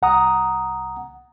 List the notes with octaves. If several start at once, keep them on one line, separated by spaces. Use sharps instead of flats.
C2 F#5 A#5 D#6